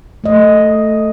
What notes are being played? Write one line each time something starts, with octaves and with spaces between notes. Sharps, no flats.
A3 D#5